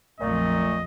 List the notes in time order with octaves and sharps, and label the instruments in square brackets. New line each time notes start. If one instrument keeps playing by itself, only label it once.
[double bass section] A#1 F2 [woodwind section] A#2 F#3 A3 [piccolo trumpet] D#5